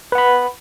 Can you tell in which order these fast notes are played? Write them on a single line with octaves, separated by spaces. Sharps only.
B4 F#5 B5